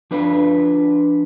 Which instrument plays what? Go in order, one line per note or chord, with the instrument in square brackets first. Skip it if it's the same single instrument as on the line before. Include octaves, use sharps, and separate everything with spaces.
[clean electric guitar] F3 D4 B4